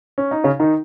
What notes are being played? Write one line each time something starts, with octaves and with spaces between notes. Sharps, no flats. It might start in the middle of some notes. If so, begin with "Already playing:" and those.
C#4
D#4
C#3 C#4
D#3 D#4